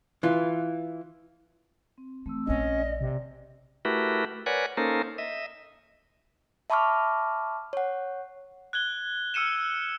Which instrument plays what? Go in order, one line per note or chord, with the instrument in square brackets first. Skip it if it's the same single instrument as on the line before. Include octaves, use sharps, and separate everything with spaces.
[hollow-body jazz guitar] E3 F4
[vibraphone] C4
[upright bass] E3 [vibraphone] A3 C4 E6
[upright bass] A#1 D4 [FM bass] C#4 [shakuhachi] D#5
[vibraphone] D5
[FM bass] C3
[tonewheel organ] A3 E4 F#4 G4 A#4 B4
A#4 B4 C#5 D5 F#5 G#5
A#3 C#4 D#4 A4 A#4 C5
D#5 E5
[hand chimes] E5 A5 B5 C#6 D6 F6
C#5 F#5
[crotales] F#6 G#6 G7
E6 F6 C#7 D#7 E7